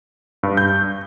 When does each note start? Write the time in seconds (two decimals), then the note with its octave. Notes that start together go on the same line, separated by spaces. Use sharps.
0.43 G2
0.57 G6